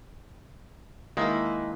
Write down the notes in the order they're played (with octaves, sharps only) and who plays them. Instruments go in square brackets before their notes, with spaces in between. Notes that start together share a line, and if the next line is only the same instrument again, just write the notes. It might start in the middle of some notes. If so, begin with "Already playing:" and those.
[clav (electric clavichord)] D#3 G#3 [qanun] A#3 E4 B4